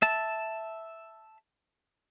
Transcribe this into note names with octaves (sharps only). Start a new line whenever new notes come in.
E5 A5